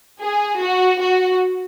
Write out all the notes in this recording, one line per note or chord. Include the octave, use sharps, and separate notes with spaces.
G#4
F#4
F#4